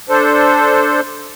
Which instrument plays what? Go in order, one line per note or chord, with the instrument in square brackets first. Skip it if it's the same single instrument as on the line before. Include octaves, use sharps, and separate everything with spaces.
[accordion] D4 A4 C5